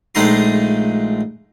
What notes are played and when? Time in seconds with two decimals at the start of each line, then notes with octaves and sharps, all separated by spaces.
0.15 A#1 G#3 A3 D#4 A#5 C6